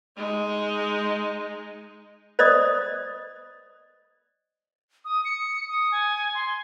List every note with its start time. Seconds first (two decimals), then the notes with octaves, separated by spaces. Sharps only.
0.16 G#3 D#4
2.39 C5 D5 D#5 D#6
5.05 D#6
5.25 C#7
5.68 D#6
5.92 G#5
6.35 C6